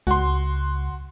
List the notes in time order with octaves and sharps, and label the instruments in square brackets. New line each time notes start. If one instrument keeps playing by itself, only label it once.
[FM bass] C#2 [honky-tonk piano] F#4 C6